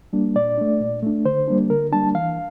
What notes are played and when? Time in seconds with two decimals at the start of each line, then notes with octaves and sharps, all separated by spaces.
0.13 G3 A#3 D4
0.36 A#2 D5
0.58 A3 D4
0.80 A#2
1.03 A3 D4
1.25 D3 C5
1.48 G3 A#3 D4
1.69 D3 A#4
1.92 G3 A#3 D4 A5
2.14 E3 F5